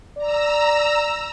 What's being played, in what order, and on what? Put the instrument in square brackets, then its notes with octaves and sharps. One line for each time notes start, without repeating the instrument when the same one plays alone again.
[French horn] D5 [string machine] A#5 E6